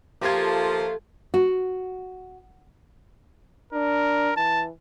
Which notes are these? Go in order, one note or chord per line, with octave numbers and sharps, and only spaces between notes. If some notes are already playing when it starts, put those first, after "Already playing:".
F3 A3 A#3 F4 G4 G#6
F#4
D4 A#4
E3 A5